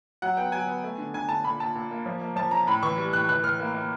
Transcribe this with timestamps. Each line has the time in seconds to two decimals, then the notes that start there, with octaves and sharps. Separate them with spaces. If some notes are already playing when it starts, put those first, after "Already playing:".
0.22 F#3 F#5
0.37 B3 G5
0.52 F#3 G#5
0.68 B3
0.84 A3
0.98 D3
1.14 D3 G#5
1.29 D3 A5
1.44 A#2 B5
1.60 A#2 A5
1.75 A#2
1.91 A#3
2.06 F3
2.21 A#3
2.36 F3 A5
2.51 C#4 A#5
2.67 A2 B5
2.83 E3 C#6
2.97 G3
3.13 A2 F#6
3.29 E3 F#6
3.44 E3 F6
3.60 A#3
3.75 A#3